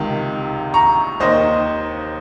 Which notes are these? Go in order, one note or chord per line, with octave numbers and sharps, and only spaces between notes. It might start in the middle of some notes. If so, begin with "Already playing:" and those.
Already playing: C#2 C3 D#3
A#5 C#6
D#2 D#3 C5 D#5